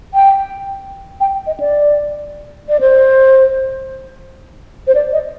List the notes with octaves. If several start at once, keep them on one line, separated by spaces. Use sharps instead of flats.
G5
G5
D#5
D5
D5
C5
C5
D5
D#5